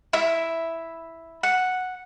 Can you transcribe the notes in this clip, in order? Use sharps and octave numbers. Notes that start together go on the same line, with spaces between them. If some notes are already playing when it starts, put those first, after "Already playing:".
E4 E5
F#5